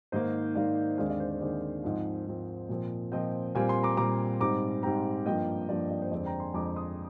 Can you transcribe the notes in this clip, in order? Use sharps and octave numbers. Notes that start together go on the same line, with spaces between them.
G#2 D#3 A#3 C5 D#5
G#2 D#3 A#3 D5 F5
D#2 D3 G#3 C4 D5 F5
D5
C5
C5
D#2 D3 G#3 C4 D5
G#2 F3 C4 C5 D#5
G#2 F3 C4
A#2 F3 C4
A#2 F3 C4 D#5 G5
A#2 G3 C4 F5 G#5
G#5 C6
A#5 D6
A#2 G3 C4 A#5 D6
G#2 G3 C4 A#5 D6
G#2 G3 C4 G5 A#5
G2 F3 A#3 D#5 G5
G2 F3 A#3 D5
D5
C5
F2 D3 G#3 C4 D5
G5 A#5
G#5 C6
F2 D3 G#3 C4 A#5 D6
C6 D#6